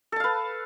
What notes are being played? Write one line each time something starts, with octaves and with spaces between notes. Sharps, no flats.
A4 B4 F5 A5